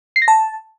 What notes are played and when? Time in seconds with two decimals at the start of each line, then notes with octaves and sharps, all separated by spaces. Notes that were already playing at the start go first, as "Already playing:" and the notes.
0.16 C7
0.22 A#6
0.28 A5